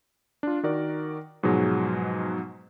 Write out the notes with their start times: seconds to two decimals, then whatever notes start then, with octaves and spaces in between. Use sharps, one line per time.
0.43 D4 F4
0.63 D#3 F#4 A#4 D5
1.43 G#2 B2 F3 F#3 G#3